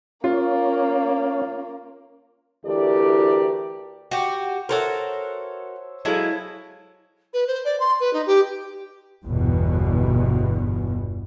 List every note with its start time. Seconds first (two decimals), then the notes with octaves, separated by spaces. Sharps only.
0.24 A#3 C#4 F4
2.64 D2 E3 E4 G4 A#4 D5
4.11 F#4 G4
4.69 F#4 A4 A#4 C5 C#5 E5
6.05 F#3 G#3 E4 A4 F5
7.34 B4
7.47 C5
7.65 D5
7.80 C6
8.00 B4
8.13 D#4
8.26 G4
9.25 G1 E2 B2